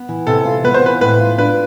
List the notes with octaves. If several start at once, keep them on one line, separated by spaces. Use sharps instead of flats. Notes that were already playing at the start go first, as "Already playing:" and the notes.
Already playing: B3
E3
C3 A4
F4
B3 B4
C5
E3 B4
A2 B4
F4
D4 B4